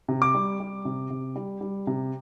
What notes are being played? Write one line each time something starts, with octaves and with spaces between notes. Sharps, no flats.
C3
D6
G3
G3
C3
C3
G3
G3
C3